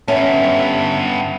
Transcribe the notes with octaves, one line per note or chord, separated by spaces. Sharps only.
G2 B3 C#4 E5